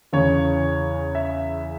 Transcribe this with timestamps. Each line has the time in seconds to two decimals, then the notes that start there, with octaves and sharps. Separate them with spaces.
0.13 E2 C#3 E3 C#5
1.15 E5